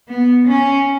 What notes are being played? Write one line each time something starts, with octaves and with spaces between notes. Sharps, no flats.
B3
C#4